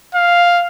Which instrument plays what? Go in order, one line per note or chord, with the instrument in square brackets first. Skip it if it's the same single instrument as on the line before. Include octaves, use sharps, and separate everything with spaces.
[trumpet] F5